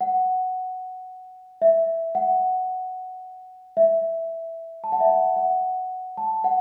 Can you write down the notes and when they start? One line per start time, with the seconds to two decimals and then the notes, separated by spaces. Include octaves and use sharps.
0.01 F#5
1.62 E5
2.15 F#5
3.77 E5
4.84 A5
4.92 F#5
5.01 E5
5.09 F#5
5.36 F#5
6.17 A5
6.44 F#5